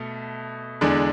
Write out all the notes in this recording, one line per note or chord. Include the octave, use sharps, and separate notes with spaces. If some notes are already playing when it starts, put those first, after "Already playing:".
Already playing: B2 A3 A4
E2 D3 G#3 D4